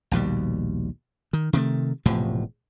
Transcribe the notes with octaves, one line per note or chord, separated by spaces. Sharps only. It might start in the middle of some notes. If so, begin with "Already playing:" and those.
A#1 D#2 B2 G3
D#3
C3 D#3 G3 A3
E1 A2 C3 F3